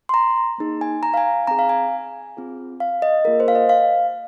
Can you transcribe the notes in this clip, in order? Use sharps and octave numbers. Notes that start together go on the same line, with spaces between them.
C6
A#5
A#3 D#4 G#4
G#5
A#5
F5
G#5
C4 G#4 A#5
F5
G#5
C4 F4 G#4
F5
D#5
A#3 F4 G#4 A#4
C5
F5
D#5
F5